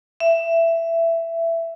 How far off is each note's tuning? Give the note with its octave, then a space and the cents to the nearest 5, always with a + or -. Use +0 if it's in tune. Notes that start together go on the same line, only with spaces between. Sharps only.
E5 +15